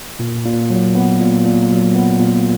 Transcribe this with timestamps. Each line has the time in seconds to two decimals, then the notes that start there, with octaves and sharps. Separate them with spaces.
0.19 A#2
0.45 A#2
0.70 F#3
0.95 B3
1.20 A#2
1.45 A#2
1.70 F#3
1.95 B3
2.20 A#2